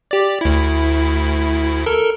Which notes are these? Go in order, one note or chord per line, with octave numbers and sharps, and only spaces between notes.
G4 D5
D2 E4
A4 A#4